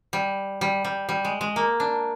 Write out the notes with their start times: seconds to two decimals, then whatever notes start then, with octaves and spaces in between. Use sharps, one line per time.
0.13 G3
0.61 G3
0.85 G3
1.09 G3
1.25 G#3
1.41 G#3
1.56 A#3
1.80 D4